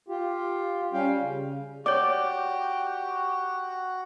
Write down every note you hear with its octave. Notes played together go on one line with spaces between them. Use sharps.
F4 G4
G3 C#4 F5 G5
C#3
F#4 G4 C#5 D5 D6